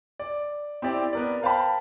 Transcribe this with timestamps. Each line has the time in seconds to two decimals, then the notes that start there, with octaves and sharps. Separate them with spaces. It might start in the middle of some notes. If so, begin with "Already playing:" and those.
0.19 D5
0.82 C4 E4 G4 D5
1.13 B3 A#4 D5
1.42 A#4 C5 F5 G5 A5 B5